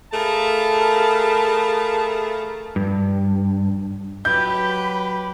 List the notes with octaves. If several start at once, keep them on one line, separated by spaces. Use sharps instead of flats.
A3 G#4 A#4 F5 A5 B5
G2
F#3 G4 B4 B5 G6